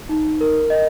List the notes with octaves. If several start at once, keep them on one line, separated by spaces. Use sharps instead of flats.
D#4
A#4
D#5